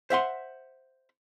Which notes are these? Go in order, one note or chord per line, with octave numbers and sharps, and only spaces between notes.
C5 E5 F#5 C6